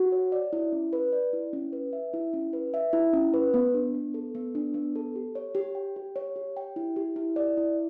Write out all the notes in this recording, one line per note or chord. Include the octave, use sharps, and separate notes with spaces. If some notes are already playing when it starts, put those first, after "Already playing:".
Already playing: F#4
C#5
D5
E4
C#4
B4
D5
E4
C#4
B4
E5
E4
C#4
B4
E5
E4
C#4
B4
B3
D4
B3
A4
B3
D4
B3
A4
G4
C#5
G4
G5
G4
C#5
G4
G5
E4
G4
E4
D5
E4